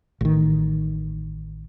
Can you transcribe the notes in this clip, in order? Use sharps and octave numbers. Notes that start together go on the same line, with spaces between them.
A1 D#3